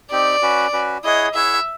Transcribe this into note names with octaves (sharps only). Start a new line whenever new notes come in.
C4 D#4 G4 D5
C#4 F#4 B4
C#4 F#4 B4
E4 G#4 C#5 D#5 F#5
E4 G#4 C#5 E5 F#5